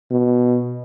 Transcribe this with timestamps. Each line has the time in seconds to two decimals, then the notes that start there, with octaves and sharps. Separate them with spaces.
0.11 B2